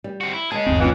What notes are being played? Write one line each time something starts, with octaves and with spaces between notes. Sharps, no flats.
G3
C4 F#4
E4
G#3 C#4 G#4 A5
G1 D#2 C4
B2 E3 C#4 F4 F5